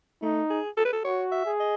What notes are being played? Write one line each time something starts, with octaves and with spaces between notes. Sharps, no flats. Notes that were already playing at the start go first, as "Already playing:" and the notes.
A3 D#4
G#4
A4
B4
A4
F#4 C#5
E5
G#4
D#5